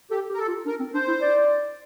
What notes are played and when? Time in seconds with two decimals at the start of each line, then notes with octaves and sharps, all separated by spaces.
0.11 G4 A4
0.29 G4
0.34 A#4
0.39 A4
0.47 F4
0.66 D4 A#4
0.79 C4
0.94 D4 C5
1.08 E4
1.21 D5